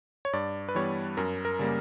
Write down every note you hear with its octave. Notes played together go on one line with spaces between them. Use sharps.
C#5
G2 D5
B4
E3 G3 B3 C#5
F#2 A#4
A#4
C#3 G3 A#3